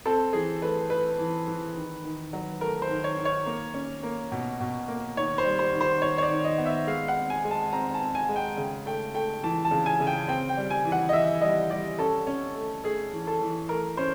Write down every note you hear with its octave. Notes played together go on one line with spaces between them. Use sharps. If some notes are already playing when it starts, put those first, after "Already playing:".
C4 A4
E3 G#4
A3 B4
A3 B4
E3
E3
D#3
D#3
F#3
A3 A#4
C5
D#3
C#5
D#3
C#5
A#3
C#4
A#3
B2
B2
A#3
D#3 C#5
C5
G3
C5
D#3
C5
D#3 C#5
C#5
D5
D#3
D#5
B3
E5
G#3 F5
F#5
C4
G#5
G#3
A5
C4 A#5
A5
C4
G#5
G#3
G5
C#3
A3 G5
A3 G5
E3 A5
A5
C#3
G#5
C#3
G5
C4 G5
G5
G3
G#5
E3
F#5
D#5
E3 E5
G3 D#5
G3 D5
C#4 A4
C#4
A3
A3 G#4
E3
A4
E3
A3 A#4
C#4 C5